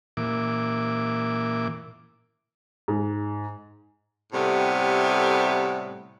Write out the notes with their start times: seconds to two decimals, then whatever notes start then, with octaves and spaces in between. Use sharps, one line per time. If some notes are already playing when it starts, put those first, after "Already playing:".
0.17 A#2 E3 D6
2.88 G#2
4.33 A2 C3 G3 A3 B3